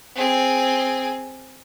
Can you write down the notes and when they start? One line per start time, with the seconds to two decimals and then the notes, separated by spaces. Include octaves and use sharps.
0.15 C4 G#4